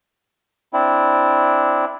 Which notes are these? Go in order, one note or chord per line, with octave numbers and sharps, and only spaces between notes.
C4 D4 E4